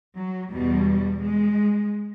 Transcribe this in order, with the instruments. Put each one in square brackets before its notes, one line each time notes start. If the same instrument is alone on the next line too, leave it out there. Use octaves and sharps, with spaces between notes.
[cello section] F#3
E2 B2 G3
G#3